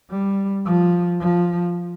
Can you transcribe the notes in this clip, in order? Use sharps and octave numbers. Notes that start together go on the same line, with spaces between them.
G3
F3
F3